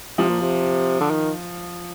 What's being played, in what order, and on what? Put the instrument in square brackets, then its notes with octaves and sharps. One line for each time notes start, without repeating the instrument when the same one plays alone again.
[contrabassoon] C3 [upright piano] F3
[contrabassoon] A#2
C3
D3
D#3